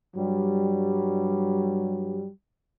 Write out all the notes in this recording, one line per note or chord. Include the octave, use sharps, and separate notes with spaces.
G2 F#3 G3